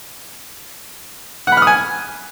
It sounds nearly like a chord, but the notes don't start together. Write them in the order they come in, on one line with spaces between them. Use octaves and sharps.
F#5 B5 F6 D#6 G#5